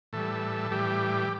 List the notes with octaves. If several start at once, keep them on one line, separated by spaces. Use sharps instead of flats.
A2 E3 G3 A4
A2 E3 G3 G4